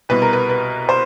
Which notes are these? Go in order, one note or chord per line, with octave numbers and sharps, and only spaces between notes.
C2 B2 B4
A#4
B4
B4
C5